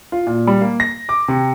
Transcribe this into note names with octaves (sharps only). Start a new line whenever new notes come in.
F4
A#2
G3
A#3
A#6
D6
C3